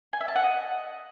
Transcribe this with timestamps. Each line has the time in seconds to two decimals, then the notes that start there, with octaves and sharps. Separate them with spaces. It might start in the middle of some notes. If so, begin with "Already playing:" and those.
0.13 G#5
0.21 E5
0.28 A5
0.36 F#5
0.43 D#5